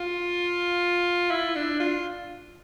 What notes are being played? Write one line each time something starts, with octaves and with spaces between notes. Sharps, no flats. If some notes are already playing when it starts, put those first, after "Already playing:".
Already playing: F4
E4
D4
F4